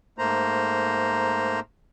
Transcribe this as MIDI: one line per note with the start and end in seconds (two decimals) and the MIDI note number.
0.18 1.60 44
0.18 1.60 57
0.18 1.60 58
0.18 1.60 72
0.18 1.60 82